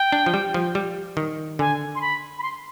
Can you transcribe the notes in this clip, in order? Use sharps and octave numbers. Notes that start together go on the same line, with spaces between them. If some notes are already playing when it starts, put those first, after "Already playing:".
Already playing: G5
D4
F3
G3
F3
G3
D#3
D3 G#5
C6
B5
B5
C6